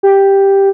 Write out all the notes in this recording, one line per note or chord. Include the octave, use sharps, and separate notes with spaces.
G4